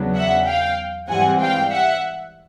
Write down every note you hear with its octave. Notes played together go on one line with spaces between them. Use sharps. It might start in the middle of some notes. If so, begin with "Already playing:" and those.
Already playing: E2 C#3 F#3 B3 D4
E5 F#5
F5 G5
G#2 E3 G3 C4 F#5 G#5
F5 G5
E5 F#5